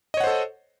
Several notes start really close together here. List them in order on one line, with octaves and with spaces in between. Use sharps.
D#5 C#5 F#5 C5 A4